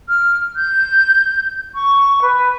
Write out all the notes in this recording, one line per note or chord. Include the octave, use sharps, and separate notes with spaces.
F6
G6
C#6
B4